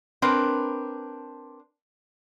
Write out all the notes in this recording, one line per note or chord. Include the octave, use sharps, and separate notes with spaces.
C4 D4 A#4 B4